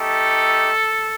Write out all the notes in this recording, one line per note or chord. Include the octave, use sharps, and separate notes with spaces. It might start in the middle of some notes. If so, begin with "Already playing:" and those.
Already playing: A3 D#4 G4 A4